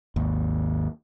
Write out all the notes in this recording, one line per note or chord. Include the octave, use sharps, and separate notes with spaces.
G#1 D#2